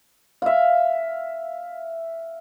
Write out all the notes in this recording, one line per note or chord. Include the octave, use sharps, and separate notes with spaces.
E5 F5